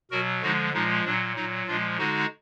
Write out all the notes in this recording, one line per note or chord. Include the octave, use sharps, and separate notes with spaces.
B2 F#3 F#4 A#4
D3 F3 G#3 D#4 F#4
A#2 F3 G#3 D#4
A#2 F#3 D4
A#2 F#3 D#4
A#2 F3 G#3 D4 F4
D3 G#3 D#4 F#4